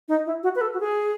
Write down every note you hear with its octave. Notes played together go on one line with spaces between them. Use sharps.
D#4
E4
F#4
B4
A4
F#4
G#4